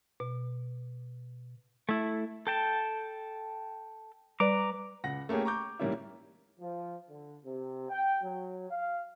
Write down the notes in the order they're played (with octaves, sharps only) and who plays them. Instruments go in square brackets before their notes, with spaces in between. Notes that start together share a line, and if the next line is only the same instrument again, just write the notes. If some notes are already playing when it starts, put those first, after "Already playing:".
[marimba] B2
[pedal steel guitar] A3 E4
A4 G5 A5
[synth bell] G3 B4 D5 [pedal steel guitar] A#5 D6
[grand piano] C#2 F#5 A#6
A3 A#3 C#4 G4 G#4
A#5 C#6 D6 G6
G#2 E3 G3 A#3 C#4 E4
[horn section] F3
D3
C3
G5
F#3
F5